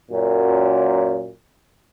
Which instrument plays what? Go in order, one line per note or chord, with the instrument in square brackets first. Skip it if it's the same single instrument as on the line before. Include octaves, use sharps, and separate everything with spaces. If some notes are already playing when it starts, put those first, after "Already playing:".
[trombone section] F#2 A#2